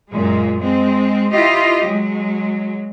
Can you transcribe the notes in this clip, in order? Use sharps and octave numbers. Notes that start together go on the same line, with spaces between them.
F#2 A#2 G#3
G#3 C4
E4 F4 G4 D#5
F#3 G#3